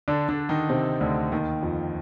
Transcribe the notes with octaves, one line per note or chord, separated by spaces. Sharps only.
D3 D4
D3 D4
D#3 D#4
C3 C4
D2 D3
D#2 D#3
F2 F3